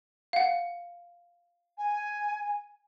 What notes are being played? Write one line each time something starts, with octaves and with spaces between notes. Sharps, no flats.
F5 F#5
G#5